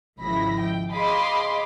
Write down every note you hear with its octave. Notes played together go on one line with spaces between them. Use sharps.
G#1 C#2 F3 E4 B5 A#6
G5
G#4 D#5 F5 B5 C6 D6